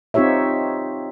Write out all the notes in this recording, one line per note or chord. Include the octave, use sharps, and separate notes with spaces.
C4 D#4 F4 G4 C#5 E5